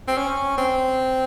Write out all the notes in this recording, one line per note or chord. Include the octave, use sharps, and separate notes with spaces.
C4
C#4
C4